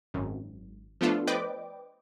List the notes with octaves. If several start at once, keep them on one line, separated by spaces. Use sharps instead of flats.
G#1 F#2
F3 A3 B3 D4 F4 A4
B4 C5 D5 D#5 G5 D6